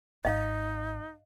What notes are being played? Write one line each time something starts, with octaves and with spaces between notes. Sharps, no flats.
G#1 D#4 D#5 F5